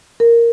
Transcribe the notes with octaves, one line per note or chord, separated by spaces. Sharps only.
A#4